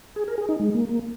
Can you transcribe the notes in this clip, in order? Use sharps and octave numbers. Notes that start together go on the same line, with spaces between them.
G#4
A#4
G#4
D#4
G#3
A#3
A#3